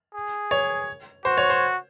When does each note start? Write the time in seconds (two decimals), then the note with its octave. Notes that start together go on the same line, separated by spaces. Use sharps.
0.15 G#4
0.51 C#5
1.25 F#4 C5
1.38 C#5
1.50 C5